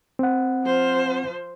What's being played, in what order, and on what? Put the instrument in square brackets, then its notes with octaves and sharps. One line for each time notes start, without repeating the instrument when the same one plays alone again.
[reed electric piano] C4 F#5
[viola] F3 C5